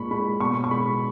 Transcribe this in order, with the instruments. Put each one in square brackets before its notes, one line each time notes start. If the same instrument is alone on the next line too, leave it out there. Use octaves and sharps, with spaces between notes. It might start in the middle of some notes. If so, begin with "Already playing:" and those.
Already playing: [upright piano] A#2 G#3 B5 C#6
G#3 B5
B2 C#6
C#6
G#3 B5